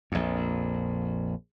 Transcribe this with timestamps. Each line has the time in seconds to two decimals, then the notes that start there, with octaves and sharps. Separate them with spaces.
0.12 A#1 F2